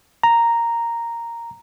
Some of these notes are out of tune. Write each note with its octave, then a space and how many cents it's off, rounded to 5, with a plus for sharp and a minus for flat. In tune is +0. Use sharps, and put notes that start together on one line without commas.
A#5 -5